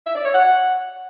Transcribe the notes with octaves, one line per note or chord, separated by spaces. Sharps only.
E5
D5
C#5
F#5